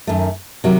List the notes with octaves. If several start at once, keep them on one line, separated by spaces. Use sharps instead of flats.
F#2 D#3 A3
C3 D#3 F#3